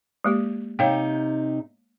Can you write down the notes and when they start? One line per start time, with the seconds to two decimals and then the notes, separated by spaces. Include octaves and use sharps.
0.24 G#3 A#3 G4
0.79 C3 D#4 C#5 F5 G5